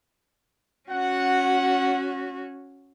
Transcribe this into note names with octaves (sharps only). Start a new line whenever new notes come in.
C#4 F#4 F#5